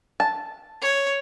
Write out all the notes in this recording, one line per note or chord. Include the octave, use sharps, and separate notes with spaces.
A5
C#5